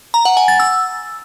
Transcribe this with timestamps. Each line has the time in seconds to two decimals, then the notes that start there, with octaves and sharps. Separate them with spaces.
0.14 A#5
0.25 F#5
0.37 G#5
0.48 A6
0.60 E6